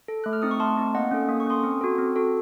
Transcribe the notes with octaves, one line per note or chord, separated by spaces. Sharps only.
A4
A3 F#6
F6
C4 D#4 D#6
C#6
A3 A5 C6
C4 D#4
A#3 D#5 F#5
C#4 A4
A#3 D#6
C#6
C#4 A4 C6 D#6
C4
F#4 A4
C4
F#4 A4